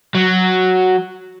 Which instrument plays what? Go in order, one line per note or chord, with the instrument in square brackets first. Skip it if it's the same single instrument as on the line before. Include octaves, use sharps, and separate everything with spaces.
[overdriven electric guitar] F#3